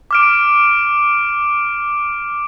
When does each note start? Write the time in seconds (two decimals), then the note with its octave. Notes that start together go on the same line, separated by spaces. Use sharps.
0.11 D6 F6 D7